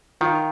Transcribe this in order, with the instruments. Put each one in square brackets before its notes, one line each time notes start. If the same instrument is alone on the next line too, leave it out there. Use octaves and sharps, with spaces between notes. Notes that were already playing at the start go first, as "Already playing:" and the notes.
[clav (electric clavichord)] D#3 [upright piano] F4